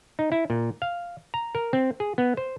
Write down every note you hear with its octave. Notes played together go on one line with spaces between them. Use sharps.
D#4
E4
A#2
F5
A#5
A#4
C4
G#4
B3
C5